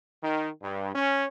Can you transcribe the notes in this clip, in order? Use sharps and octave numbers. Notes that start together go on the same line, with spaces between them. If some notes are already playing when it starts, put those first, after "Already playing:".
D#3
G2
C#4